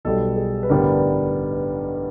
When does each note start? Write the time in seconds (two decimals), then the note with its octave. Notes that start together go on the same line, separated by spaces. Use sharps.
0.05 B1 B2 G3 A4
0.37 G#4
0.63 B4
0.69 A1 G2 D3 G3 B3 A#4